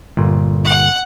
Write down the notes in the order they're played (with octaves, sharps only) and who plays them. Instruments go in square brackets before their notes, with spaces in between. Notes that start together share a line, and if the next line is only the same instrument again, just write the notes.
[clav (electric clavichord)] G1 A#2
[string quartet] F#5